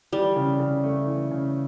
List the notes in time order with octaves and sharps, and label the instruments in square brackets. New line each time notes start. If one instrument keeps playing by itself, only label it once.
[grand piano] E3 [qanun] G3
[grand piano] C#3
C#3
A3
E3
C#3